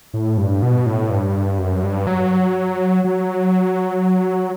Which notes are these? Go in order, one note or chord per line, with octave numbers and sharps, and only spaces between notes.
A2
G2
B2
A2
G2
F#2
G2
F#3
F#3